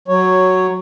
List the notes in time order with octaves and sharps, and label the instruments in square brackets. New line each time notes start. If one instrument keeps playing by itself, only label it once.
[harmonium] F#3 C#5